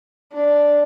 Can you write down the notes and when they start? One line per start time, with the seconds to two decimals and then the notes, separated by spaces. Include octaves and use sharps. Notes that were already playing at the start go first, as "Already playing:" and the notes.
0.33 D4